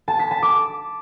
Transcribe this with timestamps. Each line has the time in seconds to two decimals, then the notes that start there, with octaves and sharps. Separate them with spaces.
0.08 A5
0.19 B6
0.31 A5
0.42 D6